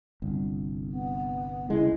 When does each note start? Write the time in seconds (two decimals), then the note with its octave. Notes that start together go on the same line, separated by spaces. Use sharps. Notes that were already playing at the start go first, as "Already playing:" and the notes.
0.22 G1 C2
0.90 B3
1.70 C2 C#3 G#3 E4